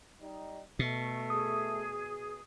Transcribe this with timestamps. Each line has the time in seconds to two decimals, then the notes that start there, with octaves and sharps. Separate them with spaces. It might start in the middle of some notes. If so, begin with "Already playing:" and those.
0.22 G3 D#4
0.79 B2 A3
1.30 G#4 D#6